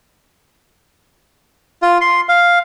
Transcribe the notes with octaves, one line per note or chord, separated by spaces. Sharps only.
F4
C6
F5